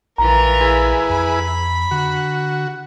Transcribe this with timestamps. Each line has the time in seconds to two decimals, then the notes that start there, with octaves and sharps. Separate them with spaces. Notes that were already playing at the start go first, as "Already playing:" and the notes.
0.18 A#1 E3 F4 A#4 A#5
0.61 E4 G#4 B4
1.09 F2 B5
1.91 D3 F#4